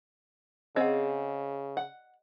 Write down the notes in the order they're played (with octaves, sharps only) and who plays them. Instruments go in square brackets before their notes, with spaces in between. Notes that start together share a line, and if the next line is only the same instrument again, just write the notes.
[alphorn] C#3 [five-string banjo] C4 G#4 [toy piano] D#5 F#5
[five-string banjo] F#5